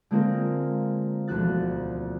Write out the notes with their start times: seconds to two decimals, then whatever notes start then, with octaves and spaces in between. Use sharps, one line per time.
0.11 D3 G#3 A#3 C4 F4 A#4
1.27 E1 D2 F3 F#4 F#6 A6